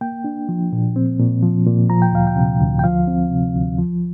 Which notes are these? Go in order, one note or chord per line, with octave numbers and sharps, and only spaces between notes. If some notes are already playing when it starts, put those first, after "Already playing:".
A#3 G5
D4
F3
A#2
C4
A#2
F3
A#2
F3 A#5
G5
D2 F5
G5
C3
D2
G5
F3 F5
C4
C3
D2
F3